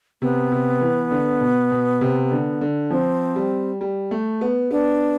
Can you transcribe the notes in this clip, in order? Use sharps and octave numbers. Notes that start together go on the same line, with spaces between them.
C3 B3
C3
E3
D3
B2
B2
C3
D3
D3
F3 C4
G3
G3
A3
B3
B3 D4